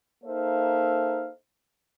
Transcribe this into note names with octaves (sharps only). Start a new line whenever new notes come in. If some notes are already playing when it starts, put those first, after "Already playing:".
A#3 D#4 A4 C5 E5 F5